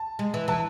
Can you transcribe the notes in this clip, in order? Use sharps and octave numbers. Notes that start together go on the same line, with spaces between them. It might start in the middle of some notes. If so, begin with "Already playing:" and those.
Already playing: A5
G#3
E3
E3 A5